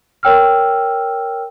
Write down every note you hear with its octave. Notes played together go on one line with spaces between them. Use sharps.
A#4 C#5 G5 E6 F6